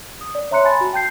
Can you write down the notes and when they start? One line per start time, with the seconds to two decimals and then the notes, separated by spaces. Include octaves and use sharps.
0.21 D#6
0.35 D5
0.51 C#5 E5 A#5 C6 F#6 C#7
0.65 G#5 A5 B5 C6 A6
0.81 F#4
0.93 G5 A5 G6 C7